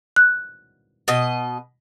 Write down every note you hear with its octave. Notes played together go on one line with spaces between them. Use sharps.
F#6
B2 D#5